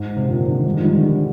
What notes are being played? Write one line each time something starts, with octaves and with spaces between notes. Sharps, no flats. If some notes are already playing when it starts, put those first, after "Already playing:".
Already playing: G#2
C3
A#2 D3
C3 D#3
D#3 G3
F3 G#3
D#3 G3
D3 F3
D#3 G3